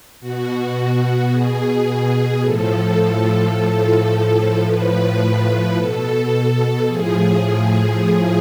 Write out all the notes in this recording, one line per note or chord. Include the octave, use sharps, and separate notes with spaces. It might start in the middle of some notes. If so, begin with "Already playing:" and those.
B2 F#4
B2 G#4
A2 F3 A4
A2 F3
A2 F3 B4
B2 A4
A2 F3 G#4
A2 F3 G#4